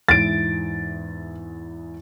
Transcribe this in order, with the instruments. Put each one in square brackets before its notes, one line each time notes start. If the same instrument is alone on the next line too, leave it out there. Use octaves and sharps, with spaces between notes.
[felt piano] E2 G#2 E4 [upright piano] A6 D7